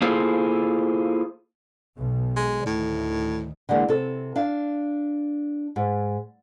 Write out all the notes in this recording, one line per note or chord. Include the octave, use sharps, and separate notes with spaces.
A#3 E4 F4 G#4 A4 C5
B1 B2
G#3
D2 A2 D#3
D3 E3 G#3 A#3
C3 A4
D4 F5
G#2